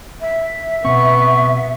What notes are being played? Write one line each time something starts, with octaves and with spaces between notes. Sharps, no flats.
E5
B2 B3 C4 C#6